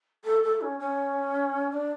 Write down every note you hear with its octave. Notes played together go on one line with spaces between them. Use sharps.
A4
A4
C#4
C#4
D4